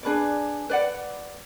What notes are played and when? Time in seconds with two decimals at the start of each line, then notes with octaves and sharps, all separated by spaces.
0.03 D4 G#4 B4 D5
0.69 B4 D5 F#5